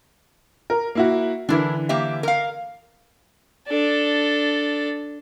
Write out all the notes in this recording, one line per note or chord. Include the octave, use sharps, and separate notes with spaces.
A#4
A#3 E4 F#4
D3 E3 D4 E4 A#4
A#3 G4 E5
A#4 F5
D4 A4